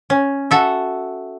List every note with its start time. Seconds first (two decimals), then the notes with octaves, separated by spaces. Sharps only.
0.10 C#4
0.51 F#4 A4 E5